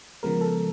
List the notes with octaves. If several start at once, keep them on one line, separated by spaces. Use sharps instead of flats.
C#3 F3 G#3 B3 A#4
A4